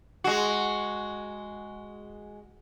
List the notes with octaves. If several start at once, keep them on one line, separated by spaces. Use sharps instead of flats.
G#3 F#4